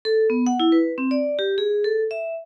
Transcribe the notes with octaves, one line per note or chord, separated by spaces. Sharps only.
A4
B3
F#5
E4
B4
C4
D5
G4
G#4
A4
E5